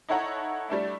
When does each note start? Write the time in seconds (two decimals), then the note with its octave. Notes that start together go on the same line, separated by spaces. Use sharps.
0.09 D#4 E4 A4 C#5 F#5 A#5
0.68 G3 A3 D4 E4